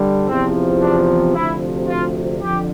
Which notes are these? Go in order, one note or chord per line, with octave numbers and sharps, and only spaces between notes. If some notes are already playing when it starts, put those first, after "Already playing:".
Already playing: D3 G3
E2 C3 F3 C4
D4
D2 C3 F3 E4
F4
F2 D3 G4